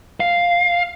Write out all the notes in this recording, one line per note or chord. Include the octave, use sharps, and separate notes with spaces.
F5